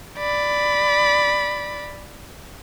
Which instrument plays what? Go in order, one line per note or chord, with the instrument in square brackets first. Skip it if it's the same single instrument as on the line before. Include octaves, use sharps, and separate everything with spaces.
[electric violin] D5 B5